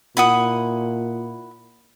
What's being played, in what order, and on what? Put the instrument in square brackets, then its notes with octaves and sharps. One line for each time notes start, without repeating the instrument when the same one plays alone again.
[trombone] A#2 [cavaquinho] E4 F#5 D#6